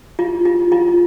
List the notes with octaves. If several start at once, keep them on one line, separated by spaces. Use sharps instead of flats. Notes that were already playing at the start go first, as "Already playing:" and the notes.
F4
F4
F4